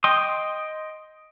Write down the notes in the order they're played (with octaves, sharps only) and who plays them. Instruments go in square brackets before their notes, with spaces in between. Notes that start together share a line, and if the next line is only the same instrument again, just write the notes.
[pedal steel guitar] D#5 G5 C6 D#6